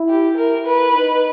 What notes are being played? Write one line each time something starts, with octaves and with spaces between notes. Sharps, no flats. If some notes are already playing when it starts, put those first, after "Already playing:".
Already playing: E4
G4
A#4
B4
D#4